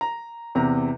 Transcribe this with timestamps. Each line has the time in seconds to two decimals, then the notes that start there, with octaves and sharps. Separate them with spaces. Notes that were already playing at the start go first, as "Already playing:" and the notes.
0.01 A#5
0.55 E2 C3 A#5